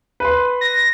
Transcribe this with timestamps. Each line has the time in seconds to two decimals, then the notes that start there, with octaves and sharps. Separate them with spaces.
0.20 B4 C6
0.61 A#6